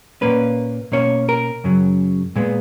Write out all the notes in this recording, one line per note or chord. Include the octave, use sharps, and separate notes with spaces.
A#2 A#3 C#4 B4
B2 A#3 C#4 C#5
A#4
F#2 C#3 F#3
A#2 G#3 B3